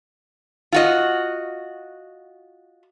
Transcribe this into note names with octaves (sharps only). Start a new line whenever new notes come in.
F4 F#4 D#5